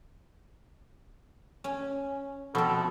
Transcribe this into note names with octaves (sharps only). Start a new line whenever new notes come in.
C#4
B2 F3 C4 A4